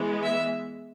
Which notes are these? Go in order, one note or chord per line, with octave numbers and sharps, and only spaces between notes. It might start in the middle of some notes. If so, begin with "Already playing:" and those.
Already playing: E3 G#3 B3
E5